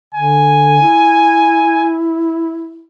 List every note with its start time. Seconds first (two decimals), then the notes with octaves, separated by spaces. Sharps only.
0.14 D3 G#5
0.81 E4